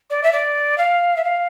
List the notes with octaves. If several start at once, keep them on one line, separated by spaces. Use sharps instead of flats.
D5
E5
D5
F5
E5
F5